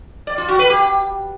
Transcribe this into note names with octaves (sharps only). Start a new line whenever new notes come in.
D5
F4
F#4
B4
G4